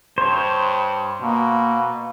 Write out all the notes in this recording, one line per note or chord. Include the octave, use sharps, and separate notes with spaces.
G2 C5 C#5
B2 A#3